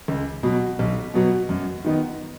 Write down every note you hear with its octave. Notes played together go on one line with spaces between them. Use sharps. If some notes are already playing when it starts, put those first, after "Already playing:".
C#2
B2 F#3
B1
B2 F#3 B3
F#2
D#3 B3 D#4